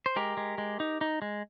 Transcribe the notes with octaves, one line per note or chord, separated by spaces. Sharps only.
C5
G#3 G4 A#4
G#3
G#3
D#4
D#4
G#3